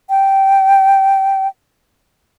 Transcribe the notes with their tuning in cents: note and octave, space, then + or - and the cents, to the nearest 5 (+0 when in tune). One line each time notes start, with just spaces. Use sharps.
G5 -15